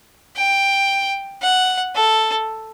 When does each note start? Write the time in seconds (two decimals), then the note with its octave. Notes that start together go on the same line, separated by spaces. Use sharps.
0.36 G5
1.42 F#5
1.95 A4